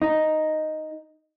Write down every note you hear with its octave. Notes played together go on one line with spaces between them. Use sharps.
D#4